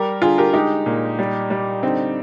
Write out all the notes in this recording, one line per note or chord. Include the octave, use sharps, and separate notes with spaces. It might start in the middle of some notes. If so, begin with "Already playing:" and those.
Already playing: G3 G4 A#4
D3 F4 G#4
G4 A#4
G#3 D#4 G4
A#2
G3
G3
D3 C4 D#4